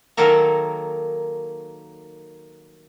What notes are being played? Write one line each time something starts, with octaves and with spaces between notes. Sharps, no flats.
D#3 F#3 A#3 A4 A#4